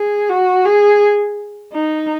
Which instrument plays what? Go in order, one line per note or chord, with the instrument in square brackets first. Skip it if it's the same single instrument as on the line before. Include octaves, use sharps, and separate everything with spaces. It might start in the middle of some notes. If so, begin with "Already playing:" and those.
Already playing: [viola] G#4
F#4
G#4
D#4